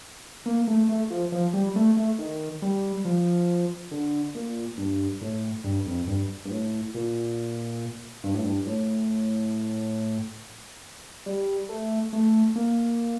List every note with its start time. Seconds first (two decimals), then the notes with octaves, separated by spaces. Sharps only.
0.46 A#3
0.68 A3
0.89 A3
1.10 F3
1.32 F3
1.54 G3
1.76 A3
1.97 A3
2.19 D#3
2.62 G3
3.05 F3
3.91 D3
4.35 A#2
4.77 G2
5.21 A2
5.64 G2
5.86 F2
6.07 G2
6.45 G2
6.51 A2
6.94 A#2
8.24 G2
8.34 A2
8.44 G2
8.67 A2
11.26 G3
11.69 A3
12.13 A3
12.56 A#3